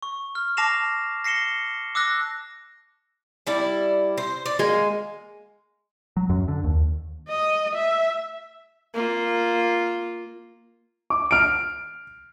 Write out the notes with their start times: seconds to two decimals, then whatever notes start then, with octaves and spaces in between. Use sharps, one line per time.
0.03 C#6
0.35 F6
0.57 A5 D6 A#6 C7 E7 F7
1.24 A#6 C7 C#7 E7 G7
1.95 D6 E6 F#6 A#6
3.47 G3 E4 D5
4.18 C5
4.46 D5
4.59 G#3 A#3 G#5
6.17 F#3
6.29 F#2
6.48 D3
6.64 D#2
7.29 D#5
7.75 E5
8.94 A#3 F4
11.10 D6
11.31 F6 D7